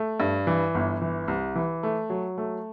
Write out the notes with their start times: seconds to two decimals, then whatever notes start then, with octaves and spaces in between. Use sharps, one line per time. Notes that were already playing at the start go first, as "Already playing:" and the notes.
Already playing: A3
0.20 G2
0.47 E3
0.75 G1
1.02 E3
1.28 C2
1.55 E3
1.83 A3
2.10 F#3
2.38 A3